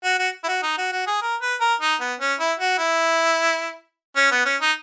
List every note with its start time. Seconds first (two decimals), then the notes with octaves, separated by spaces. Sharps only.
0.04 F#4
0.19 F#4
0.44 E4
0.48 F#4
0.63 D#4
0.78 F#4
0.92 F#4
1.07 G#4
1.22 A#4
1.41 B4
1.60 A#4
1.81 D#4
2.00 B3
2.20 C#4
2.39 E4
2.60 F#4
2.78 E4
4.16 C#4
4.31 B3
4.45 C#4
4.61 D#4